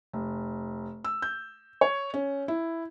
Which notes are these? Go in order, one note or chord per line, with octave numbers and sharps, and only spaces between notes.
F1
E6
G6
C#5
C#4
E4